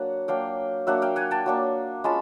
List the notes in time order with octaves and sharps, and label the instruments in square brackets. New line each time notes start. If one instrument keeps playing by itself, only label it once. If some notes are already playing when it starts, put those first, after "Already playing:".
Already playing: [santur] F#3 A#3 D4 F#5
F#3 A#3 D4 F5 G5
F#3 A#3 D4 E5 F#5
F5 G5
F#5 G#5
G5 A5
F#3 A#3 D4
G#3 C#4 F4 A5 B5